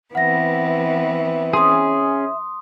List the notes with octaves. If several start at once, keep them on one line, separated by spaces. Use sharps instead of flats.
E3 B3 C4 E5 F#5 A#6
C#4 G#4 C6 D#6